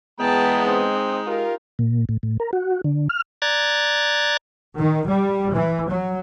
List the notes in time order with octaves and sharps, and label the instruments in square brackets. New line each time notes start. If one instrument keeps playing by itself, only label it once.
[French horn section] E2 B3 [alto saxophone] G#3 [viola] G5 A5 [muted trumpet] A#5
[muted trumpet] C4 [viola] D#4
[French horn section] F4 G4 A#4
[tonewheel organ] A#2
A2
A2
A#4
F#4
D3
F6
D5 A#5 F#6 G#6 A6
[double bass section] D#3
G3
E3
F#3